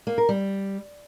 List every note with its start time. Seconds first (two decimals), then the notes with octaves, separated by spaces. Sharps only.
0.07 A#3
0.18 A#4
0.29 G3